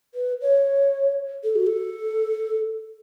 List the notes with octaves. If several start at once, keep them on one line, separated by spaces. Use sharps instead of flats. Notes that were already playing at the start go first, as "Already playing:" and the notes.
B4
C#5
A4
F#4
A4